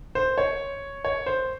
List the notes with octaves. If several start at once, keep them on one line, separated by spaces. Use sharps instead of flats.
C5
C#5
C#5
C5